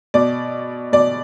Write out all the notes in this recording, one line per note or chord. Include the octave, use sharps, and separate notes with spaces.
B2 D5
B2 D5